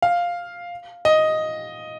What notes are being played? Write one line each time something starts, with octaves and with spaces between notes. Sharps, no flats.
F5
D#5